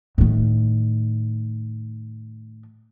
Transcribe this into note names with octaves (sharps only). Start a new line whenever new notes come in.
A2 D#3